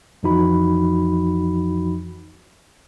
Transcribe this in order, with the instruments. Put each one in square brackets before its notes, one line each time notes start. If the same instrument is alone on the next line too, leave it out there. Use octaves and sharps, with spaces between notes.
[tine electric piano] F2 E3 F3 D#4 F#4 B5